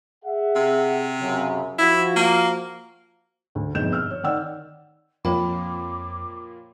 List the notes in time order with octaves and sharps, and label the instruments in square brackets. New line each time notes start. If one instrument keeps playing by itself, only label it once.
[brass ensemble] G#4 E5 F#5
[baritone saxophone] C3
[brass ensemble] F#2 C#3
[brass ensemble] F3 F#4 [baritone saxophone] E4
[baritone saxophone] A#3
[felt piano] D2
G1 F2 G#2 B2 G6 E7
E6 F6
C#5
D#3 D5 F#5 E6
[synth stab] F2 [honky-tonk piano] A#2 F3 A#3 [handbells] C#5 G5 B5 [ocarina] D6